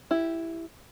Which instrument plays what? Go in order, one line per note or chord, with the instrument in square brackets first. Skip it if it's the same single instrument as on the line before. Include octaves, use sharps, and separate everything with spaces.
[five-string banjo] E4 G4